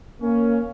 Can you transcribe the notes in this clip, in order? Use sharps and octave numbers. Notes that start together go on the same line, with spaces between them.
A#3 C#4